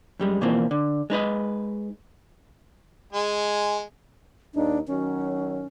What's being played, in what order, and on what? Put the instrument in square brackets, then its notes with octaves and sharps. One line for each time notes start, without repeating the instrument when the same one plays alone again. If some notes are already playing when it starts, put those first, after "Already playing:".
[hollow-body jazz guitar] F#2 G3 G#3
B2 E3 F3 A#3 C4
D3
G#3 D#4 B4 D#5
[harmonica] G#3 G#4
[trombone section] D#2 D#4 [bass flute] D4
[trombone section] D#3 F#3 [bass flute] C#4